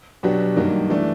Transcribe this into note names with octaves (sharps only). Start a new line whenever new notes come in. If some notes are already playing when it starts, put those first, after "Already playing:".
B2 F#3 B3 D4 G4
G2 D#3 F#3 A#3 D#4
E3 A3 D4